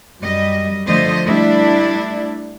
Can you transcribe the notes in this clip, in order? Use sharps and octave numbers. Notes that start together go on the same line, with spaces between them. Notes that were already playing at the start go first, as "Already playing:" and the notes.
F#2 G3 D#5
D3 F3 A3 C5 D#5
G3 A3 D4 E4